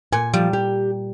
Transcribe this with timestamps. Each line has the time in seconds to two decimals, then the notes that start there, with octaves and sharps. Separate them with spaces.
0.13 A#2 G#5
0.33 F3 G3
0.53 G4